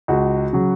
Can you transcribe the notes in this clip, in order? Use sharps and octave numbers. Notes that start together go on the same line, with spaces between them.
C#2 F#4
C#3 F#3